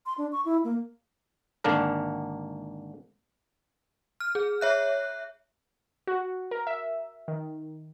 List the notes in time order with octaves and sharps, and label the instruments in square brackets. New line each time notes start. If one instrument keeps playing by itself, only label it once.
[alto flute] C6
D4
C#6
E4
A#3
[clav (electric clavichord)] G#1 D3 A#3 D4 A#4
[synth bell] F6
G#4
C#5 E5 F#6
[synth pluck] F#4
A#4
E5
D#3